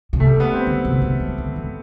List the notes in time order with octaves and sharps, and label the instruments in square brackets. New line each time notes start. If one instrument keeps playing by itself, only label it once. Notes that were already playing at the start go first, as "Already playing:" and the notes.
[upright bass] C3
[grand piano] A3
G3
B3
C4
[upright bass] D3
C3
C3
F#3
D3
E3